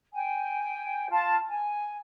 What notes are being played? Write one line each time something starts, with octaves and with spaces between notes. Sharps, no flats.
G5 G#5
F4 A5
G#5